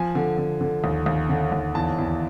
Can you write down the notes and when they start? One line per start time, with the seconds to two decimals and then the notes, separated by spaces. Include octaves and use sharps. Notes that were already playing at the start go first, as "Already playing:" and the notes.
Already playing: F3 G#5
0.15 D3
0.38 D3
0.61 D3
0.84 D#2
1.06 D#2
1.29 D3
1.52 D#2
1.75 E2 A5
1.98 E2